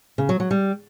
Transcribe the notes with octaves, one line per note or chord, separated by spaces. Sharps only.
C#3
F#3
F#3
G3